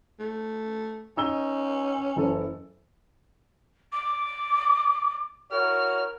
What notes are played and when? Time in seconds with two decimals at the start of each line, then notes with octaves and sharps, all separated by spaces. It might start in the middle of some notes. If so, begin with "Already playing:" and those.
0.19 A3
1.17 C#4 D#4 E6 G7
2.16 F#1 E3 A4
3.92 D6
5.51 E4 F#4 A#4 C#5 F6